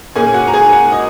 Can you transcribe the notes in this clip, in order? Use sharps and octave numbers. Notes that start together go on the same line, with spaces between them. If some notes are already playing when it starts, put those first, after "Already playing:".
A#2 A#3 C#4 G#4 G#5
F#4 F#5
A#5
G#4 G#5
F#4 F#5
F#5
D#5